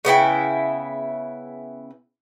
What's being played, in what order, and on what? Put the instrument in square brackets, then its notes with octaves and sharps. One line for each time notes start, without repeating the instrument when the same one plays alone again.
[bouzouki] C#3 B3 E4 G5